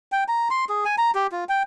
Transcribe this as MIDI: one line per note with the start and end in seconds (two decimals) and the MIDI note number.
0.12 0.24 79
0.28 0.48 82
0.51 0.65 84
0.69 0.84 68
0.85 0.96 80
0.98 1.11 82
1.15 1.27 67
1.32 1.44 65
1.49 1.63 79